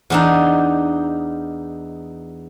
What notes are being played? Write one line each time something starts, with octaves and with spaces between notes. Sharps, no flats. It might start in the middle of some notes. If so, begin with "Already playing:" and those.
E2 D4 D#4